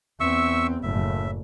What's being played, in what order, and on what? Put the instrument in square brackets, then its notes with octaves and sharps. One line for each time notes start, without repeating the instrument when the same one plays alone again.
[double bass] E2 C4 [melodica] E5 C#6 E6
[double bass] F#1 A2 [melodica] E5